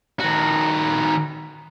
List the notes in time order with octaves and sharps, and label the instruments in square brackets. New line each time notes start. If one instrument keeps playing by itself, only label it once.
[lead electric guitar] D#3 F#4